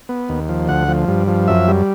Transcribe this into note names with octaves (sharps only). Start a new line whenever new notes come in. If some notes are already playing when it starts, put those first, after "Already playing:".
B3
D#2
F3
D2 F#5
F3
G2
F3
F#2 E5
G3